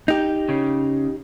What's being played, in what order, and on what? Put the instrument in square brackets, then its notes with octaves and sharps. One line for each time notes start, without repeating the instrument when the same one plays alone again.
[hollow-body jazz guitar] D#4 G4
[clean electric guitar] C#3